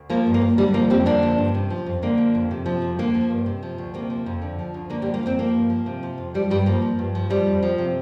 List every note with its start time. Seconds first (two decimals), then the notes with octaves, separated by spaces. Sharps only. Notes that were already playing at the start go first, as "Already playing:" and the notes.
Already playing: D2
0.10 F3 A#3
0.27 G2
0.34 A#3
0.41 F3
0.58 D3 G3
0.74 F3 A#3
0.90 F2 G3 C4
1.06 D3 A#3 D4
1.23 F3
1.38 G2
1.55 C3
1.70 F3
1.86 F2
2.02 D3 A#3
2.18 F3
2.35 F2
2.51 C3
2.66 F3
2.82 F2
2.99 D3 A#3
3.15 F3
3.30 G2
3.46 C3
3.63 F3
3.78 D2
3.94 C3 A#3
4.10 F3
4.26 F2
4.42 D3
4.59 F3
4.74 D2
4.90 D3 A#3
5.02 G3
5.06 F3
5.14 A#3
5.23 F2 G3 C4
5.39 F3 A#3
5.55 G2
5.70 F3
5.86 C3
6.03 F3
6.18 F2
6.34 F3 G3
6.50 G2 G3
6.66 F3 A#3
6.82 F3
6.99 G2
7.15 F3
7.30 F3 G3
7.47 F2
7.63 F3
7.78 C3